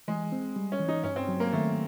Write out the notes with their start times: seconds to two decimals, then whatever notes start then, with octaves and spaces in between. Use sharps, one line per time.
0.08 E3 G#3
0.32 C4
0.56 G3
0.72 C#4
0.80 E3
0.88 D#4
1.04 G2 C#4
1.16 C4
1.29 F#3
1.40 A#3
1.53 D#3 A3